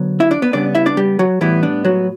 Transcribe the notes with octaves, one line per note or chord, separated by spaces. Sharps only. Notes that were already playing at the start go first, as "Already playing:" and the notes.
Already playing: D3 F#3 B3
E4 E5
D4 D5
B3 B4
C#3 G3 B3 D4 D5
E4 E5
D4 D5
G3 G4
F#3 F#4
A2 E3 G3 B3 E4
D4
F#3 F#4